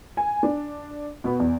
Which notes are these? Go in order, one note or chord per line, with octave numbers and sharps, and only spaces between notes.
G#5
D4
B2 B3
E2